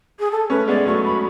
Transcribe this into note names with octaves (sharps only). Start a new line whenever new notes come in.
G#4
A4
A3 C#4 B4
G#3 B3 D5
F#3 A3 C#6
B5